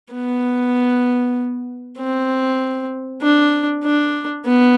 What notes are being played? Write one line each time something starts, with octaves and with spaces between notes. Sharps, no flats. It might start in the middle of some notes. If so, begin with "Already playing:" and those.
B3
C4
D4
D4
B3